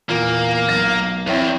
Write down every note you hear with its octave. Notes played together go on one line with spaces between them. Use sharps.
E2 A#2 A#3
B1 A6 A#6
E2 C4 E4 C#5